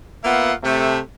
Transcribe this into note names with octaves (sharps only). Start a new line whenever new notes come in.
A#3 B3 F4 E5 F#5
C3 A3